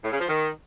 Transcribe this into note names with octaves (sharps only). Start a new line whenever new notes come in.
A2
C#3
F3
D#3